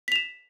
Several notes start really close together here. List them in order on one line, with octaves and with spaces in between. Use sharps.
B6 F7 E7